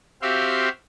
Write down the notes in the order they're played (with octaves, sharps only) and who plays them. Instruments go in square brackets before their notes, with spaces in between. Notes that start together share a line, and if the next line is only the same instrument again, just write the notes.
[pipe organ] C4 F#4 G4 E5 F5 C6